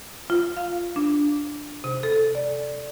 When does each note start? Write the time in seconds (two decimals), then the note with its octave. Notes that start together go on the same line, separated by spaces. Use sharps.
0.30 F4
0.57 F5
0.96 D4
1.84 C3
2.03 A4
2.35 D5